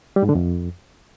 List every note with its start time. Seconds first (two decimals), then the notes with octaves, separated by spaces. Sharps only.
0.16 G3
0.23 G#2
0.29 D3
0.35 F2